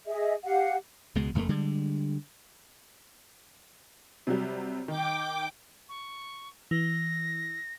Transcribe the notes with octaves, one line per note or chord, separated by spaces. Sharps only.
G#4 D#5 E5
G4 F5 F#5
C#2 B2 G#3
F#1 F2 A3 A#3
D3 G3 G#3
C3 F#3 G3
D#3 G5 D6
C#6
E3 A#6